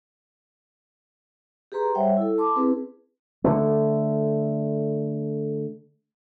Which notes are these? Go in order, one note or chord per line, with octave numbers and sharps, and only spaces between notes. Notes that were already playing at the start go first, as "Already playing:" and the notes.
G4 G#4 B4 A#5 C6
G3 C5 C#5 E5 F#5 G5
E4 A4
A5 C6 D6
C4 E4 G#4 B4
D3 A3